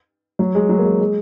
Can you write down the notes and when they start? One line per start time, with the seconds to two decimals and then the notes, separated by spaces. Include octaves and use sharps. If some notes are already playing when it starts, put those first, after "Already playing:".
0.39 F#3
0.55 G#3
0.69 F#3
0.78 A#3
0.85 G#3
1.01 G#3